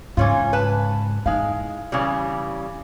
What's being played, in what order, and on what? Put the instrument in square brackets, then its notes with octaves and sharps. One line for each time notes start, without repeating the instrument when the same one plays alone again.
[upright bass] G#2 C#3 [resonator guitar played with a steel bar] E3 C#4 F4
[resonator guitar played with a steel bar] B4 A5
[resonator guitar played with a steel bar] G#3 F5 [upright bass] D#4 E4
[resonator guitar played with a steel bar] C#3 E3 G3